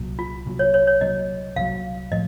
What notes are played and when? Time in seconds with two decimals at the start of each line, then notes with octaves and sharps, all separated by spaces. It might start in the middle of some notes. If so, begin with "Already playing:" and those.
Already playing: C2 A#2 F#3
0.19 F4
0.46 C2 A#2 F#3
0.59 C#5
0.74 C#5
0.87 C#5
1.01 C2 A#2 F#3 D#5
1.56 C2 A#2 F#3 F5
2.12 A2 F3 D#5